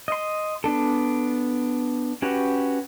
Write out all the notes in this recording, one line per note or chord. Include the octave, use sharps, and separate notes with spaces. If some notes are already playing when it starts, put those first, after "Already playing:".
D#5 C6
B3 D4 A4
C#4 F#4 G4 B4